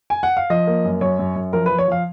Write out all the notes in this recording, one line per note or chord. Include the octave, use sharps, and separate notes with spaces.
G#5
F#5
F5
F3 D#5
A#3
F#2
F#2 C#5
F#2
F#2
F3 A#4
B4
F3
C#5
F3 F5